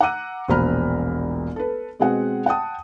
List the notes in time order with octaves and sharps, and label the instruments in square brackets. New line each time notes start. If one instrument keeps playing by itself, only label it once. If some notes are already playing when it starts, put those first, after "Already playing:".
[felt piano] F#5 A#5 D6 E6 F#6 D#7
E1 A#1 C5 A#5 B5 F6
A4 B4
B2 G#3 C4 G#4 F#5
F#5 G5 A5 D#6